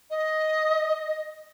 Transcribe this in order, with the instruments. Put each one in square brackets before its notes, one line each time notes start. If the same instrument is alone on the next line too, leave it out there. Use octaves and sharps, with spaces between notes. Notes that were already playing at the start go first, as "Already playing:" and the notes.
[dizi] D#5